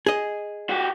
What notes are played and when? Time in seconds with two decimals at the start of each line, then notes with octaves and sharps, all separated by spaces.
0.06 G#4 D#5
0.69 F#4 G4